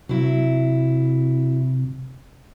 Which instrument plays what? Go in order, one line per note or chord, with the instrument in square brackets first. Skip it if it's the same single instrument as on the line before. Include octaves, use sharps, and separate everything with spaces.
[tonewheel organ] C3 [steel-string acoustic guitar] F#3 E4